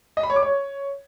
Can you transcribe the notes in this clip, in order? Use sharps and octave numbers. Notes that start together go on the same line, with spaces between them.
D#5
B5
C#5
D6
C#5